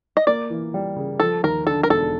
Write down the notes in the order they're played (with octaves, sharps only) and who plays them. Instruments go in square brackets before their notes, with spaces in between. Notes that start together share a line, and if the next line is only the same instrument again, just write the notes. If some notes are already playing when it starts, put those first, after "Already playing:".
[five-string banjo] D#5
[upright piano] A#3 [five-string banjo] D5
[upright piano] E3
G3
C#3
[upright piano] F3 [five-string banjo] A4
[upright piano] D#2 [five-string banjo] A#4
[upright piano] D3 [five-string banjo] A4
[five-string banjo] A#4
[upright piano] E1 [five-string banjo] A4